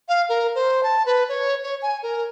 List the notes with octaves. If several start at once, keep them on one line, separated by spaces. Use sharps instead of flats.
F5
A#4
C5
A5
B4
C#5
C#5
G#5
A#4